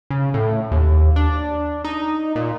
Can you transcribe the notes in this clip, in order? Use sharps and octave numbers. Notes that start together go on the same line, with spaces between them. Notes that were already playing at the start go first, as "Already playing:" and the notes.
C#3
A2
D#2
D4
D#4
A#2